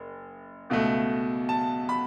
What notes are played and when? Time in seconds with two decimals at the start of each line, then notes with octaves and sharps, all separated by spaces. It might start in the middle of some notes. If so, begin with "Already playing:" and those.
Already playing: F#1
0.70 C#2 B2 A3
1.49 A5
1.89 B5